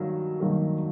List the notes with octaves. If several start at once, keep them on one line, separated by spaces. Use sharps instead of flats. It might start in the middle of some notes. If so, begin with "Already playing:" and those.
Already playing: G2 D#3 F#3 A#3
G2 D#3 F#3 A#3